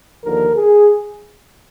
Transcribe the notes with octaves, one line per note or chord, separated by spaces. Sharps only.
D#2 D3 F3 A#4
G#4